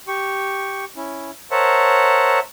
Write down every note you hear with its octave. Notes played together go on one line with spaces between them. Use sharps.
G4 C#6
C#4 E4
A#4 C5 C#5 E5 F#5 A5